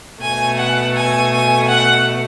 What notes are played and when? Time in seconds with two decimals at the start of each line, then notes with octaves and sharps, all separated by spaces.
0.22 B2 A3 G#5
0.58 F#5
0.94 G#5
1.31 G#5
1.67 F#5